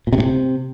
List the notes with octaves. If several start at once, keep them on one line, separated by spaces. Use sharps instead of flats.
A#2
C3
A2
C3